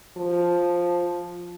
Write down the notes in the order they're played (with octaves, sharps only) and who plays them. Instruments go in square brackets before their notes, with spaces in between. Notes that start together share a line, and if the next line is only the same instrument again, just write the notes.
[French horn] F3